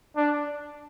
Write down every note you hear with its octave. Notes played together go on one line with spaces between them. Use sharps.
D4